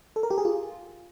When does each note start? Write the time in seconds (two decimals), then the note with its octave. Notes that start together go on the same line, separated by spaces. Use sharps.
0.16 A4
0.23 A#4
0.31 G4
0.38 G#4
0.45 F4